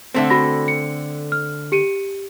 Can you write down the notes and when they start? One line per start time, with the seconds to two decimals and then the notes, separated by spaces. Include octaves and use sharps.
0.15 D3 A3 C4
0.30 F#4 B5 A#6
0.68 C#7
1.32 F6
1.72 G4 C#7 D#7